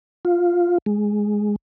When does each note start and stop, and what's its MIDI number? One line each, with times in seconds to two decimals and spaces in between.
0.25 0.78 65
0.86 1.56 56